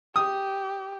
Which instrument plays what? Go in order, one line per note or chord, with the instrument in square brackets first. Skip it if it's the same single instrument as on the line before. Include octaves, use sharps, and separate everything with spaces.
[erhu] G4 [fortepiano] D#6